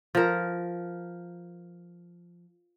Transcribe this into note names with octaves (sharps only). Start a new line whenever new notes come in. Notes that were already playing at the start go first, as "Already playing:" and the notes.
F3 A#4